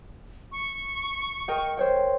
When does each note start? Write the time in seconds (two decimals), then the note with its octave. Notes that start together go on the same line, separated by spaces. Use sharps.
0.52 C#6
1.48 A#4 D#5 G5
1.77 C5 C#5 G5